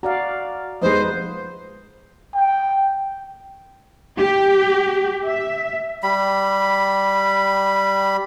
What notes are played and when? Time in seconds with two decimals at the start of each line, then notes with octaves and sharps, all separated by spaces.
0.03 F#4 D5 F5 A#5
0.82 F2 G#3 D#4 B4 C5 D#5
2.35 G5
4.18 G4
5.26 E5
6.03 G3 B5